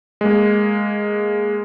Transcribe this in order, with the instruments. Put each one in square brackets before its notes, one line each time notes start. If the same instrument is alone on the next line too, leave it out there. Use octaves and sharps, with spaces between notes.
[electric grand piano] G#3 A#3